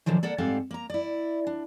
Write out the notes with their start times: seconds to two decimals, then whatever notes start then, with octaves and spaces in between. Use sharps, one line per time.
0.06 A#2 D3 D#3 F3 F#3
0.23 A#3 A4 D5 F#5
0.38 G#2 G3 C4 A4 F5 F#5
0.71 A#3 A#5
0.90 E4 D5
1.47 D4